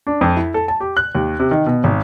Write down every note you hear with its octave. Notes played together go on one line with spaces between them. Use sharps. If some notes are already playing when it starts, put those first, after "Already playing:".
D4
F2
E4
A4
A5
G4
F#6
D#2
C3
D#3
B2
G#1